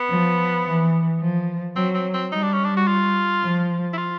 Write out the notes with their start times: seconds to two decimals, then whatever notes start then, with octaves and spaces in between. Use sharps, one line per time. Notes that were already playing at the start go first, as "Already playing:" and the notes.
Already playing: B3
0.09 F3
0.65 E3
1.20 F3
1.76 F#3 C4
1.94 C4
2.14 C4
2.32 G3 D#4
2.43 D4
2.53 C#4
2.65 D4
2.77 F#4
2.87 F4
3.43 F3
3.93 E4
3.98 F4